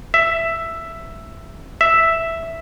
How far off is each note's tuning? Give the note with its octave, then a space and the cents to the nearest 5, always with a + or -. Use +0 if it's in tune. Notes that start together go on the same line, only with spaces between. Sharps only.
E5 +5
E5 +0